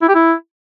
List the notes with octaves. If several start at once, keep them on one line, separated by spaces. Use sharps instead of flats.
E4
G4
E4